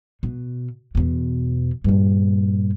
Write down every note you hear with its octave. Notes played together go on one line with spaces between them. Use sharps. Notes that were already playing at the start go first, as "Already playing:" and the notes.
B2
E2 B2
G2 A#2